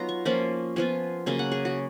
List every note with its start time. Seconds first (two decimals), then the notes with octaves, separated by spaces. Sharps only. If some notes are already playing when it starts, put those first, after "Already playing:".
Already playing: F#3 B3 D#4 F4 A#5
0.09 C#6
0.25 F3 A#3 C#4 F4 B5
0.76 F3 B3 F4 G#5
1.26 C#3 F#3 A#3 G#5
1.39 F#5
1.51 G#4
1.65 F#4